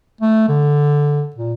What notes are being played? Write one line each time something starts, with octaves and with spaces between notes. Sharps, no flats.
A3
D3
A#2